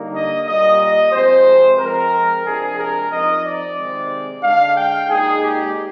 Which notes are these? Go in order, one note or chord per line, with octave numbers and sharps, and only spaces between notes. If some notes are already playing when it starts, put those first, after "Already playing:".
Already playing: D3 G3 A#3 D#4
D#5
A#2 G3 A#3 D#5
D#5
C3 F3 G#3 C4 C5
F3 G#3 C4 A#4
C3 F3 G#3 D4 G#4
A#4
F3 C4 D#4 D#5
D5
C3 D#3 G#3 C4
D3 G#3 D4 F5
G5
A#2 G#3 D#4 G#4
G4